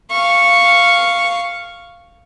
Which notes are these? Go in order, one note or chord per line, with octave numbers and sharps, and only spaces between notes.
F5 C#6